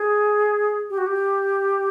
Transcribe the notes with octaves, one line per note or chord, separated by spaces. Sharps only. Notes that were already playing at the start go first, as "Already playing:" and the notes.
Already playing: G#4
G4
F#4
G4